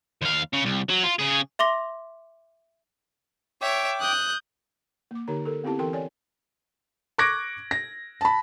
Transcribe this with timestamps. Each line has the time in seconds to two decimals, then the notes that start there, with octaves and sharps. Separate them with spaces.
0.22 D#2 F5
0.53 C#3
0.65 C2
0.89 F#3
1.03 F4
1.19 C#3 G#4
1.59 E5 C6 D6 A#6
3.62 C#5 E5 G5 D6
4.01 D#6 F#6 G6
5.11 A#3 D6
5.28 D3 D#4 G4 A#4 C#5 A#5
5.45 A4 A#4
5.64 B3 C4 E4 G4 A5
5.79 E3 A4 A#4 G5 C6
5.93 C#5 D5 G#5
7.18 C#6 D6 F#6 G#6 A#6 D7
7.71 A#6
8.21 A5 B5